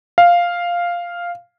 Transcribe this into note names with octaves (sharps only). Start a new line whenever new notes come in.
F5